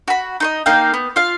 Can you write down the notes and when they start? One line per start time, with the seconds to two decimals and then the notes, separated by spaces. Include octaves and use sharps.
0.08 F#4 B5
0.40 D#4 C5 D#5
0.66 A#3 D#4 F5 G5
0.94 B3
1.16 F4 F5